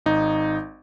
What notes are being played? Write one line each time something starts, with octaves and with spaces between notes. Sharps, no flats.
G#1 D#4